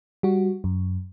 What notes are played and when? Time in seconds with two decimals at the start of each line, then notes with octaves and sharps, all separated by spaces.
0.23 G3 F#4
0.64 F#2